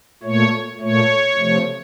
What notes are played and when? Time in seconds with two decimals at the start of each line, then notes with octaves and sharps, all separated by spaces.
0.23 A#2 A3 C#5
0.80 A#2 A3 C#5
1.38 C3 F3 A3